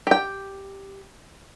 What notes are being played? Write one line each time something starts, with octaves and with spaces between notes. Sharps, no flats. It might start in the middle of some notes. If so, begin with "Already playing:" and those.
G4 G5